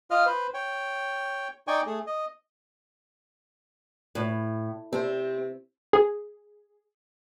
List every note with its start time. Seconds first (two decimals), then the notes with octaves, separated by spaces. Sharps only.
0.11 F4 D#5 F5 F6
0.26 B4 C5
0.54 C#5 G5
1.67 D#4 D5 G5 G#5 C#6
1.86 A3 G#4
2.07 D#5
4.15 A2
4.93 C3 C4
5.93 G#4